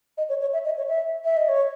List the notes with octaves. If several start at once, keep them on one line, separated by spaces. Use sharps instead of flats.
D#5
C#5
C#5
E5
D#5
C#5
E5
E5
D#5
C#5